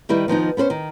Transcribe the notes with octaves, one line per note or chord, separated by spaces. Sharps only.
D#3 G3 E4 B4
D#3 F3 B3 D#4
B3 C#4 B4 C5
D#3